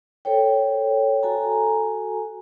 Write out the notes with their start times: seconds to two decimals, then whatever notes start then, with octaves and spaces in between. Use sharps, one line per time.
0.25 A4 C5 C#5 G5
1.23 F#4 A4 G#5 A#5